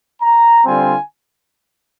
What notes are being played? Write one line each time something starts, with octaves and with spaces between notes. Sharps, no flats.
A#5
D3 G3 C4 F4 G#5